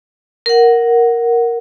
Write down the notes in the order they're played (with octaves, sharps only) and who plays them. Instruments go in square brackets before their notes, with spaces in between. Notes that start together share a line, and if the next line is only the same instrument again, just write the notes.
[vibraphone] A#4 F#5